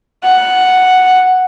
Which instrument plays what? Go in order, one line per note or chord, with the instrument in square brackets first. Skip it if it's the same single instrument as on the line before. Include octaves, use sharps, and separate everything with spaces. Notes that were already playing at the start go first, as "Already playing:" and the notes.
[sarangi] F#5